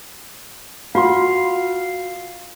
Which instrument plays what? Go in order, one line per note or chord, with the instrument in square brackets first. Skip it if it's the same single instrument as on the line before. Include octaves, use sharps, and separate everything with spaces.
[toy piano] F4 C6 [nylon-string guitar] F#4 [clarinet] F5